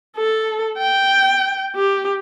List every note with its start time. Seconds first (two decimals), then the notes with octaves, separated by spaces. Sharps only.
0.17 A4
0.78 G5
1.76 G4